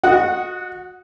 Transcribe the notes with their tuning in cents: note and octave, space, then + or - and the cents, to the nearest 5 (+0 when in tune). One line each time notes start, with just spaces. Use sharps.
F#4 -25 D#5 +0 F#5 +0